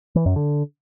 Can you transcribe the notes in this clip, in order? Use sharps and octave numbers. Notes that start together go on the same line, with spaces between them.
E3
F#2
D3